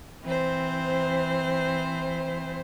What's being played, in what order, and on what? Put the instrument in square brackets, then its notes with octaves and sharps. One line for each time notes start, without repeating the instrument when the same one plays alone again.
[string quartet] E3 C4 C5